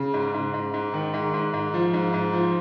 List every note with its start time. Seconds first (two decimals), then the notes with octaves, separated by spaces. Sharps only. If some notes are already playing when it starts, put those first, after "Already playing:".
Already playing: C#3
0.14 G#2
0.34 G#2
0.54 G#2
0.74 G#2
0.94 D#3
1.14 G#2
1.34 G#2
1.53 G#2
1.74 F3
1.93 G#2
2.14 G#2
2.33 F3